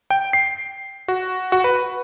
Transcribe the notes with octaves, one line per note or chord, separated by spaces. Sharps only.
G5
C7
F#4
F#4
B4